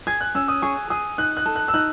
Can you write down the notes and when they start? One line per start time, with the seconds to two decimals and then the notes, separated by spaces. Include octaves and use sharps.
0.07 G#4 G#6
0.21 F#6
0.35 C#4 E6
0.48 D#6
0.62 G#4 C#6
0.90 G#4 D#6
1.18 D#4 F#6
1.37 F#6
1.46 A4
1.56 F#6
1.68 E6
1.74 D#4 F#6